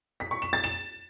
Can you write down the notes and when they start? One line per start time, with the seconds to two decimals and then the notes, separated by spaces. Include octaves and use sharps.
0.20 B6
0.31 C#6
0.42 E7
0.53 A6
0.64 E7